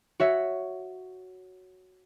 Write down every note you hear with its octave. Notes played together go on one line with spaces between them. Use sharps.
F#4 C#5 E5